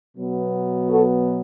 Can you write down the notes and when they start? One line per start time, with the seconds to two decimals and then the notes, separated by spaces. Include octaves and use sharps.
0.17 B2 F#3 B3
0.89 F#4 A4